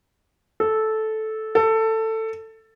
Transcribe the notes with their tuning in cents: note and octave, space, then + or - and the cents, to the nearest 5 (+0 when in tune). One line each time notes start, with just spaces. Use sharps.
A4 -10
A4 +15